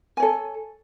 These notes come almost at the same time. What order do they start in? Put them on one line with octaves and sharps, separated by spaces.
G#5 C#5 A4